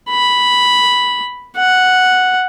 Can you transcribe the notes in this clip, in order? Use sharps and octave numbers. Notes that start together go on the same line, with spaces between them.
B5
F#5